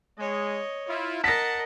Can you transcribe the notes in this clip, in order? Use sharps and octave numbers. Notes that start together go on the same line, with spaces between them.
G#3 C#5 D#5
E4 F4
A#4 D#5 F#5 A5 A#6 B6